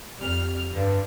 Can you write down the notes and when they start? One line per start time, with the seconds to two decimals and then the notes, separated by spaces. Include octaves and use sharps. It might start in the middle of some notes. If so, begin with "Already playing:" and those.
0.18 F2 G3 F6
0.72 G2 D3